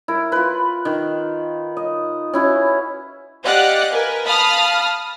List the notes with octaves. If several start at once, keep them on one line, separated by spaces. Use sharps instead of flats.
E4 A#4
F4 B4
D#3
D#5
C#4 E4 F#4
G4 D5 D#5 F5 F#5 F#6
A#4 B4 G#5
F5 A5 B5 D#6 F6